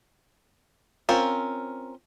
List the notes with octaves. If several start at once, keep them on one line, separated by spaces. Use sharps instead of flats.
C4 C#4 F4 A#4